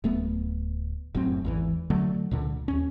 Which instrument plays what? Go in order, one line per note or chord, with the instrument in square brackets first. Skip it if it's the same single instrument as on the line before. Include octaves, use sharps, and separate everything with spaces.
[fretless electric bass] D1 A3 B3
F1 F#2 A2 C4
G#1 E2 E3
D3 F#3 A3
C#2 A#2 D3
D#2 C#4